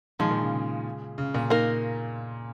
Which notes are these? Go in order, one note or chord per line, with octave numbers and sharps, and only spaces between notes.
A#2 D#3 F3 G#3
A#2
C#3
C#3
C#3
A#2
A#3 D#4 A#4